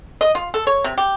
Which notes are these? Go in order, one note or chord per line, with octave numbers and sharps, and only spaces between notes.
D#5
F4
A4
C#5
C3
G4